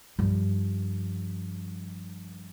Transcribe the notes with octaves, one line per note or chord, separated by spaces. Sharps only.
G2 F3